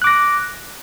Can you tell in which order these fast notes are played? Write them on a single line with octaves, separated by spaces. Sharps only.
F#6 D6 A#6